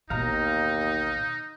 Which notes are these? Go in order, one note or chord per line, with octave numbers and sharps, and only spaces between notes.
A1 D#2 B2 D#4 F5 A#5